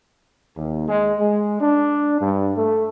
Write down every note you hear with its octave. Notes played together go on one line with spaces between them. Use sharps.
D#2
G#3
G#3
D4
G2
A3